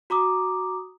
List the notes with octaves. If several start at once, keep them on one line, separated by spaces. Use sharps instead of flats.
F#4 A#5 D6 D#6